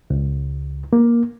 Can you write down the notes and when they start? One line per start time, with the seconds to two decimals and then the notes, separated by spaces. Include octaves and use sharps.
0.10 C#2
0.93 A#3